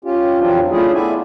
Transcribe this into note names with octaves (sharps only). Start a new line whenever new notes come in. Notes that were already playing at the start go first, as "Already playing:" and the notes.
C#4 F4 G4
F2 E3 F#3 C4 D4 F4
A3 C#4 D4 E4 F4 G#4
B3 E4 D5 E5 G#5